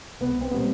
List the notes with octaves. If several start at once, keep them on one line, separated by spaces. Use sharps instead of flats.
C2 B3
C4
A#2 G3 B3